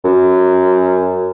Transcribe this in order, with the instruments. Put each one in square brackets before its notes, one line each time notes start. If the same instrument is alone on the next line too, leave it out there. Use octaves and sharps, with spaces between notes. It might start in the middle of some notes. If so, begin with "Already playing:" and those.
[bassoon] F#2